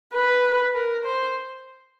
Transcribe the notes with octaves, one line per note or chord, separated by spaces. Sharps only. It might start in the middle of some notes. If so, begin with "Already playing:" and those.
B4
A#4
C5